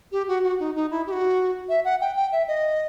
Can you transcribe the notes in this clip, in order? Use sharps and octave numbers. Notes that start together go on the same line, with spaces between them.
G4
F#4
F#4
D#4
D#4
E4
G4
F#4
E5
F#5
G5
G5
E5
D#5